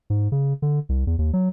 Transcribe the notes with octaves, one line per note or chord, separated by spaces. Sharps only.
G#2
C#3
D3
C2
E2
D#2
F#3